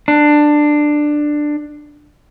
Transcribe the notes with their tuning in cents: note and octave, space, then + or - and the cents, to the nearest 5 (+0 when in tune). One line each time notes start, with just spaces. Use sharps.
D4 +15